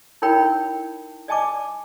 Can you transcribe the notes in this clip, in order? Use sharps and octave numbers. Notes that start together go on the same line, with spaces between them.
D#4 E4 A#4 C#5 G5 B5
D5 D#5 G#5 A5 C#6 D6